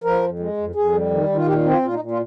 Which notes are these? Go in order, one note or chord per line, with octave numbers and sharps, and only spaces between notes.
F3 A#4
F2
G#3
F2
F2 G#4
G3
D#3
D#3
F4
A#2 G4
C4
F4
A#2 F4
D#4
A#2
F4